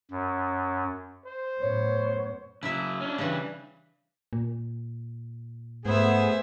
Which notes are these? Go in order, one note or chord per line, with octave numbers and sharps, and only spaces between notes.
F#2
C5
F#2 A2 B3 C#5
C#3 F#3 E4 E5
C#4 D4
C#3 E3 G3 D4
A#2
G#2 A3 B3 G#4 C5 E5